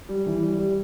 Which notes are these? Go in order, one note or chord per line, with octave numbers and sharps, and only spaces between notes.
G3
E3
G3
G3